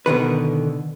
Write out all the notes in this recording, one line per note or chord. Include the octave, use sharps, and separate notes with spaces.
B2 D3 D#3 B4